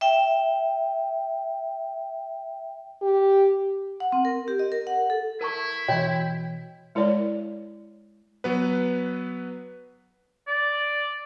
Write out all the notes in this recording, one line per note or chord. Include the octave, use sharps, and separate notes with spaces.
E5 G5
G4
F#5
C4
A#4
G4
D#5
A#4
F#5
A4
E4 A#4 A5 C#6
B2 E3 F#4 C#5 D#5 G5
G#3 E4 A#4 C#5 D5
F#3 B3 B4
D5